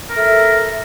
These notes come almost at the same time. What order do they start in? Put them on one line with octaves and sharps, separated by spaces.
A#4 A4 E5